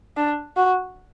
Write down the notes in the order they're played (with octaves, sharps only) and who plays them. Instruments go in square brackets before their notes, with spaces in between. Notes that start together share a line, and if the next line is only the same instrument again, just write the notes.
[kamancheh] D4
F#4